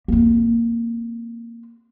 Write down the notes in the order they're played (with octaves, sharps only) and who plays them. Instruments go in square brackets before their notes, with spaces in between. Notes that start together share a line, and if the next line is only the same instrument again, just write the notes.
[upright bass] A#3 C4